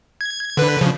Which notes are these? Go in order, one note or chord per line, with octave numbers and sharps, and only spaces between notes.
G#6
D3 B4
C#3 F3